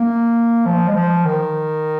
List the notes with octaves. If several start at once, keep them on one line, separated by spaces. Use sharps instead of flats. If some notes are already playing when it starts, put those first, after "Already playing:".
Already playing: A#3
F3
G#3
F3
D#3